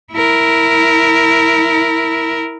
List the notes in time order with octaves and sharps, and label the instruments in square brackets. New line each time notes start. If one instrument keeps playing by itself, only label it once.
[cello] E4 A#4